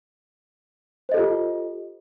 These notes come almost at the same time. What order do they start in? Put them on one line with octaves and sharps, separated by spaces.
C5 D#5 A4 G4 F4